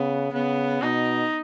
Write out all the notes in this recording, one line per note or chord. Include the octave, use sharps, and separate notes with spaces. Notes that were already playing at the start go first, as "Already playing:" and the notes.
Already playing: C#3 B3
C#3 B3
B2 D#4